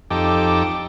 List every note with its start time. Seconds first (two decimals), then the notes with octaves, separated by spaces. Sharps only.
0.11 F2 D#4 G4 A4 D6